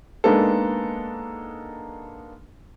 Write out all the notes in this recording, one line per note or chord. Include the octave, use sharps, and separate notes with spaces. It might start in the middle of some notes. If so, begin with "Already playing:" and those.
G#3 A#3 B3 D4 D#4 A4